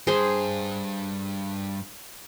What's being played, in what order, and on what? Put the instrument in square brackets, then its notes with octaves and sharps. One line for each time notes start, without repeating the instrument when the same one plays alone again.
[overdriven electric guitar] G2 [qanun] G#4 C5 C6